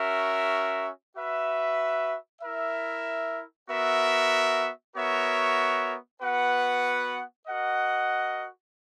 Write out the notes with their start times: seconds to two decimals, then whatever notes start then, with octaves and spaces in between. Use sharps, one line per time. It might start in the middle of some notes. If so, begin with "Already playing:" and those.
Already playing: C#4 F#4 A#4 E5
1.15 F#4 B4 E5
2.42 E4 A#4 E5
3.68 B3 F#4 A#4 E5
4.95 B3 F#4 A#4 C#5 E5
6.21 B3 F#4 B4 F#5
7.47 F#4 A#4 D#5 F#5